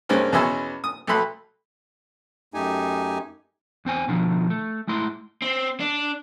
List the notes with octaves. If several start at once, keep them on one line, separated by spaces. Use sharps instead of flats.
G2 G#3 A#3 C4 C#4 D#4
E2 B2 C#4 E5 G#5 C6
D#6
B1 A3 A4 B5 C6 F#6
F#2 A3 D#4 G4 G#5
E2 C4 C5 G#5
B2 D3 D#3 F3
A3
G#3 A3 E4 C6
C4
D4